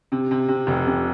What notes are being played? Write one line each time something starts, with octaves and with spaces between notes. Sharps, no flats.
C3
C3
C3
F1
C3